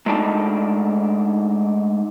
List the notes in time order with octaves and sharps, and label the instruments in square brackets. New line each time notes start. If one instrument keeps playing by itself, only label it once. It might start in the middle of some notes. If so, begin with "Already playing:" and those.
[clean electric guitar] G#3 A3 D4 D#4 A5